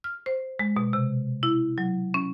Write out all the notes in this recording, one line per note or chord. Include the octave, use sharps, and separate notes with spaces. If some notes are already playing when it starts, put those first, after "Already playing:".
F6
C5
G#3
B2
C3
E4
F#3
C#4